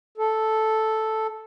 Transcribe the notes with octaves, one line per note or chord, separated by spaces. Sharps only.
A4